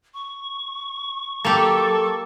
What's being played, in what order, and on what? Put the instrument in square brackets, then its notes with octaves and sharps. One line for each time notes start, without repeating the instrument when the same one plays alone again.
[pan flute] C#6
[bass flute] F#3 [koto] A#3 G4 [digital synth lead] A4